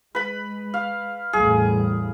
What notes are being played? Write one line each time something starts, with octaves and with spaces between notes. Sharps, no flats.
G#3 B4 B5
F5
A1 E2 G3 G#4